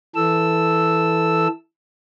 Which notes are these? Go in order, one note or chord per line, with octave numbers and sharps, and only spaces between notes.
E3 A4 E6